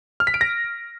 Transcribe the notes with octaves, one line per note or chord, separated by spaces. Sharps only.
F6
B6
D7
A#6